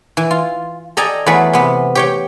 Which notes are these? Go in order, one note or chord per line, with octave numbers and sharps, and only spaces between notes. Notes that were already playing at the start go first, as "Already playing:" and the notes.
E3
F4
A4 D5 D#5 G5 G#5 A#5
E2 F#3 A3 G#4 B4 F#5
C3 B3
G4 C#5 G5